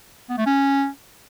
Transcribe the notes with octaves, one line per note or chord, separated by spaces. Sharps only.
B3
A3
C#4